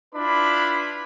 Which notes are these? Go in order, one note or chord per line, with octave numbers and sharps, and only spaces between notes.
D4 E4 F4 B4 B5